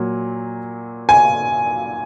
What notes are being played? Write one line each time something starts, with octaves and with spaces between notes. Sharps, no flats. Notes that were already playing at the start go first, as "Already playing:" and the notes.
Already playing: A#2 F#3
G#5